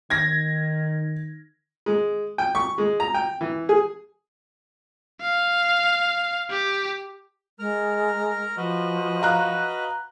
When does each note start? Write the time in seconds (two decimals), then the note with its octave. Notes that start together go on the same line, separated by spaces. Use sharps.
0.10 D#3 G#6 A#6
1.86 G#3
2.38 G5
2.55 C#6
2.78 G#3
3.00 A#5
3.14 G5
3.41 E3
3.69 G#4
5.21 F5
6.50 G4
7.59 G#3 A#4 A#5 F6
8.57 F3 F#4 B4 D#5
9.22 F5 A#5 F#6